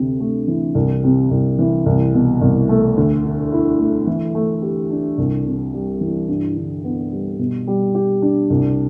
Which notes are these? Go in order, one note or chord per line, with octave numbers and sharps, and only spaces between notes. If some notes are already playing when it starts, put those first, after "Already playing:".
Already playing: D2 C3
A3
E3
C2
C3
C2
E3
C2
B2
C2
A3
D2
D3
E4
A3
E3
A3
G4
D4
C2
C3
G3
E3
G2
D3
B3
G3
B2
G3
G4
D4
C2